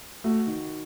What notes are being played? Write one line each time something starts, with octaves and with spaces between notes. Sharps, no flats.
A3 F#4
D#3